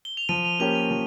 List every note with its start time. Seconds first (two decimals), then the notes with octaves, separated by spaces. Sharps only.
0.05 G7
0.17 F7
0.29 F3 D#7
0.45 F7
0.59 A#3 C#4 G4 A#4 F7
0.75 D#7
0.91 F3